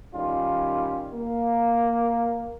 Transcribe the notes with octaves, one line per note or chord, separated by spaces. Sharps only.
D#3 G3 C#4 F4
A#3